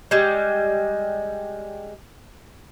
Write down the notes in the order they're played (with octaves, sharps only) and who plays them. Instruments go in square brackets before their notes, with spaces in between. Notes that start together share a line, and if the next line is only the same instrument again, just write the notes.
[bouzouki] G3 G#3